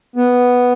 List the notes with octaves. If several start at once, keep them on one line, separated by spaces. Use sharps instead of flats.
B3